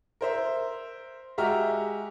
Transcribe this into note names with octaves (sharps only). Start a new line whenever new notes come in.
A#4 C5 E5
G#3 F#4 G4 E5 A#5 F6